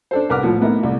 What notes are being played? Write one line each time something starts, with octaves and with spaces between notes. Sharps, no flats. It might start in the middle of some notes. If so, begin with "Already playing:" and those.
D4 A4 C5
C2 A#4 B4 F#5 D6 F6
A2 F3
A3 B3 D#4 E4 A#4
C2